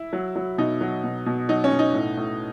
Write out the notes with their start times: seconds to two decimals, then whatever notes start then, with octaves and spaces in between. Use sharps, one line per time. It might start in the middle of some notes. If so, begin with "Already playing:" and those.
Already playing: E4
0.13 F#3
0.36 F#3
0.58 B2 D#4
0.81 F#3
1.04 B2
1.26 B2
1.49 F#3 D#4
1.64 C#4
1.72 B2
1.79 D#4
1.94 A2
2.17 A2